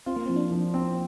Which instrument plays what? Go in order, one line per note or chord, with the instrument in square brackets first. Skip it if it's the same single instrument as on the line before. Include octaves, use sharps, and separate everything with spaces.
[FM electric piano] C4 [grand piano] F4
[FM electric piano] A#3
[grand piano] F3 [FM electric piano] C4
[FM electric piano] D4
[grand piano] F3
C4